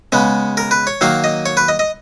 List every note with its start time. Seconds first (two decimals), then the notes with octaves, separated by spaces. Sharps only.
0.12 C#3 G#3 B3
0.57 A#4
0.71 B4
0.87 C#5
1.01 D#3 F#3 A#3 F5
1.24 D#5
1.46 C#5
1.57 B4
1.68 D#5
1.79 D#5